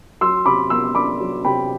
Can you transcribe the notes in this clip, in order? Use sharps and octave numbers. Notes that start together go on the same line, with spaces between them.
F#3 C6 E6
C3 B5 D6
B3 C6 E6
D4 B5 D6
F#3
C3 G5 B5